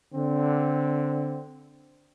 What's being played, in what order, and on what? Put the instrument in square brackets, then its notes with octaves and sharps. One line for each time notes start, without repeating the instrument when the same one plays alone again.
[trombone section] D3 C4